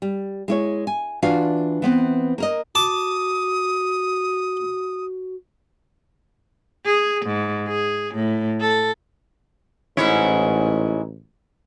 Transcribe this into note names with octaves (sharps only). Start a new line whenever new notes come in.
G3
G#3 E4 C#5
G#5
E3 D4 F4 F#4 D5 F5
E3 B3 C4
A#3 A#4 D#5
F#4 A5 D6 D#6
G#4
G#2
G#4
A2
A4
A1 G#2 E4 C#5